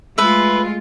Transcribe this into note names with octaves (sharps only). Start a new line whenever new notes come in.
G#3 A3 F4 B4 E5